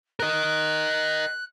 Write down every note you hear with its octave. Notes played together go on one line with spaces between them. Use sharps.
A#4 D#5 F#6